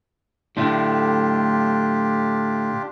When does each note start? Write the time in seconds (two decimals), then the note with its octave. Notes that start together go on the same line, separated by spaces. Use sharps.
0.57 A2 D3 A3 D4 F4 G4